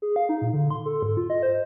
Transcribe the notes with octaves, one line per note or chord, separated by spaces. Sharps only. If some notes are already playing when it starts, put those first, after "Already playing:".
G#4
F5
D#4
A#2
D3
C6
A4
G#2
F4
D#5
C5